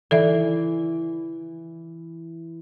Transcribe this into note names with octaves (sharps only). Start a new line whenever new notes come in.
E3 A4 D5 E5